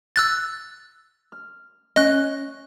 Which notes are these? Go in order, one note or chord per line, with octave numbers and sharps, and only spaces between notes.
E6 F#6 A6
F6
C#4 C#5 D#5 F#6